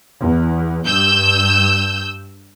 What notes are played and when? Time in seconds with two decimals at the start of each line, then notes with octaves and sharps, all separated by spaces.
0.20 E2
0.85 G2 E6 G6